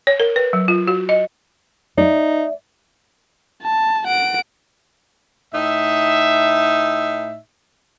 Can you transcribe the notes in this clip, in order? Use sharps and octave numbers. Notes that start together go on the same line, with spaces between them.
C#5
A#4
B4
F#3
F4
F#4
D#5
D#4 D5 E5
A5
F#5 D7
A2 D#4 E5